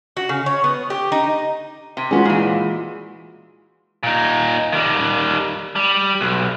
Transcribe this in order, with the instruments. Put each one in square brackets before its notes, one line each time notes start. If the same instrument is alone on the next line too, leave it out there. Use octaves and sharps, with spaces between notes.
[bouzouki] F#4
C#3
C#5
B3
G4
D#4
[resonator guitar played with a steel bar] C3
[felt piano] G#3 F4 F#4 [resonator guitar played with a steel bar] B3 C#4
[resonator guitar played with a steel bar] A#2 E3
[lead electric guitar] A#2 D#4
D#3 G3
G3
B1